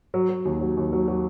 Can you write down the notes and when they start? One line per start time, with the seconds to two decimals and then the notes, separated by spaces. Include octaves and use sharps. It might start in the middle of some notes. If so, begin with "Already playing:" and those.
0.14 F#3
0.29 F#3
0.45 D#2
0.61 F#3
0.77 D#2
0.93 F#3
1.08 F#3